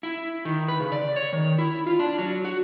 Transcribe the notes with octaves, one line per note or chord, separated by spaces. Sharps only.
E4
D#3
B4
C#3
D5
C#5
D#3
E4
F4
D4
F#3
F#4